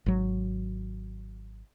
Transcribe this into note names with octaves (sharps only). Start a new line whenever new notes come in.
G#1 F#3